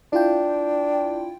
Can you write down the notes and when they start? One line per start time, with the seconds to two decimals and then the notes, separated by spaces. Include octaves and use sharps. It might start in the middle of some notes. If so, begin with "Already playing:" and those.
0.13 D4 E4 F4 G5